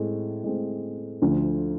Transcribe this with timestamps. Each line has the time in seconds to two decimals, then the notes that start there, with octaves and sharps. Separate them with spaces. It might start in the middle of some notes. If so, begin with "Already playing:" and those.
Already playing: A2 G#3 C4
0.44 A2 G#3 C4
1.22 D2 D3 F3 A3